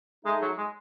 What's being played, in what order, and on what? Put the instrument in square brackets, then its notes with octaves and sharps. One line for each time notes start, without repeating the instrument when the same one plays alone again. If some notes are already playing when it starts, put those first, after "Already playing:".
[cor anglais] G#3 [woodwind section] A3 D#4 G#4
[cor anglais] F#3
G#3